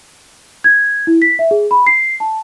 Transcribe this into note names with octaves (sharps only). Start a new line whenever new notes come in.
G#6
E4
B6
E5
G#4
B5
C7
A5